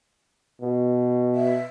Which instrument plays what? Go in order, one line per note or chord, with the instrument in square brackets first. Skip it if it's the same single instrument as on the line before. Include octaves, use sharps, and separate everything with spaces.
[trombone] B2
[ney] E5